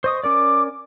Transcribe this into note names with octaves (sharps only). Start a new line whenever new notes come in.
C5 D#5 C#6 D#6
C#4 A#4 D5 D6